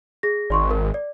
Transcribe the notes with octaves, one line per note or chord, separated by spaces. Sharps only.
G#4 A#6
G#1 D5 C6 C#6
A#4
D5